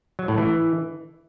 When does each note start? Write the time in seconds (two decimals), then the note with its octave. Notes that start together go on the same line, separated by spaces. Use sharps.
0.19 F#3
0.28 A2
0.38 E3